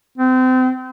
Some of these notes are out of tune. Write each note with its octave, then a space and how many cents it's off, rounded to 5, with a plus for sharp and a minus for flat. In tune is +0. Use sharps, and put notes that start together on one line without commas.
C4 -30